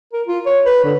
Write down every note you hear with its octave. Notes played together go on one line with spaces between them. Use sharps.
A#4
F4
C#5
B4
D3